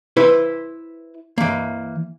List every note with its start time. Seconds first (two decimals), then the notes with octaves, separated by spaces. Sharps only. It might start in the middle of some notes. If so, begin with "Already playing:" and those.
0.17 E4 B4 C5
1.38 E3 A#3